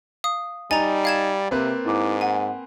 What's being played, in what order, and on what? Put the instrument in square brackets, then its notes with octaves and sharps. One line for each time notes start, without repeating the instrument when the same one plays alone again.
[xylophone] F5 D#6
[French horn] G3 [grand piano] D#4 [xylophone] G#5 A#5 [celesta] A6
[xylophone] F5 G#6 E7
[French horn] C3 [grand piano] A#3 C4 B4
[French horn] G#2 [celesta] E4 D6
[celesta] F#5 [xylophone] G#5